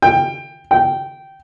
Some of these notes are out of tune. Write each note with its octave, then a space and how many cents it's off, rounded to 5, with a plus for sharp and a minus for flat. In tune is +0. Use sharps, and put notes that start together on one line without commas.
G5 +15
G5 -15